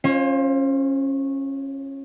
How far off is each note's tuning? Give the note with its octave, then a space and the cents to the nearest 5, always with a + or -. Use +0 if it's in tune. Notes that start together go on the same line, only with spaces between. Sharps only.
C#4 -20 F4 +0 C5 +25